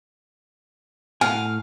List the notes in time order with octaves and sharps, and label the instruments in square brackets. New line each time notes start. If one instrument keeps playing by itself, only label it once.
[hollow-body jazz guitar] A2 F#5 G#5 [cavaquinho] F5